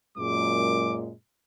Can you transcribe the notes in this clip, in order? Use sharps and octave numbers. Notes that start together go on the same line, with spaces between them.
F#2 A#2 G#3 D6